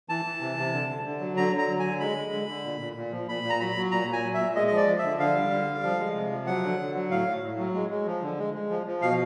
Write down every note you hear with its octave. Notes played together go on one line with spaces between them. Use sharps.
E3 A5
E3
C3
C3
D3
D3
D3
F#3
D3 A#5
D3
A#5
F#3
D3 G#5
G#3 B5
G#3
D3
D3
A#2
A#2
A#2
F3
A#2 B5
A#2
A#5
F#3 B5
F#3
A#2 A#5
A#2
G#5
F#3
E5
A#2
G#3 D#5
F3 D#5
D5
F3
D3 E5
D3 F5
G3
D3
G3
F3
G#3
C3
F3
F#3 F#5
D3
D3
F#3
A2 F5
A2
A2
F#3
G#3
G#3
F3
D3
G#3
G#3
F3
F3
B2 F5